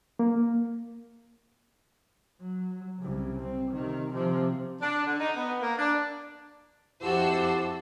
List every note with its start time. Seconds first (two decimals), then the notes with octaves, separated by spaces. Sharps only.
0.19 A#3
2.41 F#3
3.00 C2 C#3
3.42 C4
3.71 C3 D#3
4.12 C3 F3
4.81 D4
5.07 D3
5.20 D#4
5.36 B3
5.61 A#3
5.79 D4
7.02 F2 E4 F#4 G4 C5 A5 D6 E6